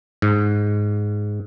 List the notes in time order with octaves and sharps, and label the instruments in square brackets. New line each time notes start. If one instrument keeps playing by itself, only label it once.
[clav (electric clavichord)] G#2